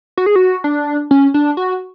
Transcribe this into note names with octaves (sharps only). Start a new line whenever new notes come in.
F#4
G#4
F#4
D4
C#4
D4
F#4